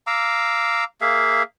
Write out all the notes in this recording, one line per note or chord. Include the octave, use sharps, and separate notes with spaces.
F5 A#5 D6 E6
A#3 G#4 E5 F5